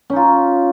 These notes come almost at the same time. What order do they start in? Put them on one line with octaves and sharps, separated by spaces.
C#4 D#4 F4